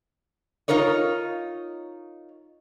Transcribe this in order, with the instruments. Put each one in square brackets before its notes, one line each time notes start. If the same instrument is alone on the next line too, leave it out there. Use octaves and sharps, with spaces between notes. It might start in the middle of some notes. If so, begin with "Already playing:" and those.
[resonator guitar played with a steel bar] D#4 F4 A#4 C#5 D#5